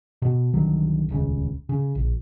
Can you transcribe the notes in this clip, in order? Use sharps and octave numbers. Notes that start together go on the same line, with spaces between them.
B2
C2 D3 D#3 F#3
D#1 C#2 C#3
C#3
A#1